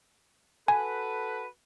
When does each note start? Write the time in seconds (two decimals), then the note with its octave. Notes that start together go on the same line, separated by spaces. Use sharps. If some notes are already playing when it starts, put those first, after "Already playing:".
0.68 F#4 A4 B4 G#5